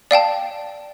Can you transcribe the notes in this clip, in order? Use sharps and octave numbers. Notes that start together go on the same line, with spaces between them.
D5 F5 G5 A5